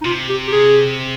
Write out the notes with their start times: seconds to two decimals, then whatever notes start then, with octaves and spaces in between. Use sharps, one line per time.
0.01 D#4
0.05 C3 F4
0.29 G4
0.47 G4
0.52 G#4